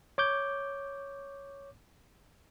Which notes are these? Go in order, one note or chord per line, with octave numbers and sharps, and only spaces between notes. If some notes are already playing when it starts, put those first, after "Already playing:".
C#5 D6 G6